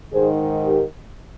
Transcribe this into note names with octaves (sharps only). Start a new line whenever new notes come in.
G#2 D#3 G#4 C5
G4 A#4